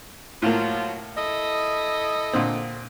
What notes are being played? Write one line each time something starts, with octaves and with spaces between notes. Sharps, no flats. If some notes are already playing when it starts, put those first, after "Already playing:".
A2 F3 F#3 A#3 F4
E4 A4 D#5
A#2 D3 C4